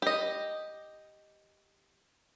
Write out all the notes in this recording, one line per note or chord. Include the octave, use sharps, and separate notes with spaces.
G4 D#5